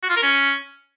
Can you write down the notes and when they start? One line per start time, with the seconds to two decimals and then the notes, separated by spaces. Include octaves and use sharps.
0.03 F#4
0.10 F4
0.16 A#4
0.23 C#4